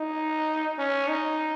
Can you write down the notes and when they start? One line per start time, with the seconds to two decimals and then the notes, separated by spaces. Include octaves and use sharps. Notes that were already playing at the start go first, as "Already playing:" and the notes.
Already playing: D#4
0.78 C#4
1.08 D#4